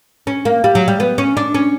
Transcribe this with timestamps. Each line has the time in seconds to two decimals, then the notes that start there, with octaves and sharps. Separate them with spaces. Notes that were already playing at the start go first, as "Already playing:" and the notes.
0.27 C#4
0.45 A#3
0.64 G3
0.75 F#3
0.88 G3
1.00 B3
1.18 C#4
1.37 D4
1.54 C#4